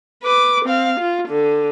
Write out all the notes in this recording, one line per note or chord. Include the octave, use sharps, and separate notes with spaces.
B4 D6
C4 F5
F4
D3